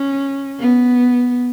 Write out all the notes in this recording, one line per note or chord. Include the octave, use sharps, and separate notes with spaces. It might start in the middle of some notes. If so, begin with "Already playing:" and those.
Already playing: C#4
B3